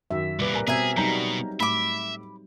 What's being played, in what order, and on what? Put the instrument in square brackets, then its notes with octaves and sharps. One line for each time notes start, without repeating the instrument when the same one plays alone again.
[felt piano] F#2 D#3 [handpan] E5
[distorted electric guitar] C2 A#2 [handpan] G3 B4 [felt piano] D6
[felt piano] A#4 G#5 A#5
[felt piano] B2 [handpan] C4 E5 [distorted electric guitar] G#4 [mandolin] A#4 G#5
[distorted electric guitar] B2 [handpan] F#3 G3 D#4 [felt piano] A#5 G6
[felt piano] A2 [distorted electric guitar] E5 [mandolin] B5 D6